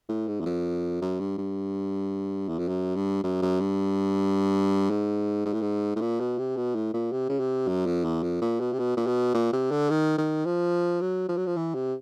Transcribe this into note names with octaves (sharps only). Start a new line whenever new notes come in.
A2
G#2
E2
F2
F#2
G2
G2
E2
F2
F#2
G2
F#2
F#2
G2
G#2
G#2
A2
G#2
A2
A#2
B2
C3
B2
A2
A#2
C3
C#3
C3
F#2
F2
E2
F2
A#2
B2
C3
B2
A#2
B2
A#2
C3
D3
D#3
D#3
F3
F#3
F3
F#3
F3
E3
C3